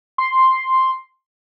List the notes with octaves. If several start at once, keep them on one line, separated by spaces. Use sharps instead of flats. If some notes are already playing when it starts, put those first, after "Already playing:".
C6